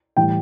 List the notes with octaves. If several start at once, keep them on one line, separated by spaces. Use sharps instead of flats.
A2 E3 G3 G5